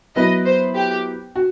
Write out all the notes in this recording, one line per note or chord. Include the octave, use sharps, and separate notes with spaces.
F#3 B3 E4 B4 D#5
C5
G4
F#4